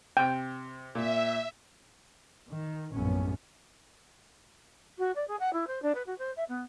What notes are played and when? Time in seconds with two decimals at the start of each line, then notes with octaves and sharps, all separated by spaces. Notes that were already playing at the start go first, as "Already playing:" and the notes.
0.17 C3 G5
0.95 A#2 E5
2.50 D#3
2.94 A#1 F#2 A2 B3 C#4
4.98 F#4
5.15 D5
5.27 G#4
5.39 F#5
5.53 E4
5.67 C5
5.82 D4
5.94 B4
6.06 F#4
6.18 C5
6.36 E5
6.48 B3